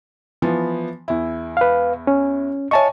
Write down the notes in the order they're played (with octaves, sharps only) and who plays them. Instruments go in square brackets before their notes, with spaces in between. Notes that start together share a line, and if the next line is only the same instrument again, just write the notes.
[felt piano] E3 F3 B3
E2 E4
[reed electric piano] B4 F5
C#4
[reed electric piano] C#5 A5 C#6 [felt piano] D#5 E5 G#5